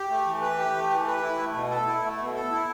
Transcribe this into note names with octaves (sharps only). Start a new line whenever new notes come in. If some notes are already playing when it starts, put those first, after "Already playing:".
Already playing: G4
A3
E3
B4
G4
A3
E3
B4
E4
A3
B2
A4
E4
A3
B2
A4
E4